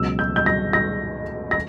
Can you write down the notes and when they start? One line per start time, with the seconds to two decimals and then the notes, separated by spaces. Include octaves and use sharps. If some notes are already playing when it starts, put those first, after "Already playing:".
Already playing: C#2 B2 F#3 E6
0.19 G6
0.36 G6
0.46 A#6
0.73 A#6
1.51 A#6